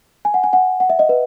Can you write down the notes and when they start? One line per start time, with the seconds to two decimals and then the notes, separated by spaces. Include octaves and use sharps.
0.25 G#5
0.34 F#5
0.44 G#5
0.53 F#5
0.80 F#5
0.90 E5
0.99 D#5
1.09 B4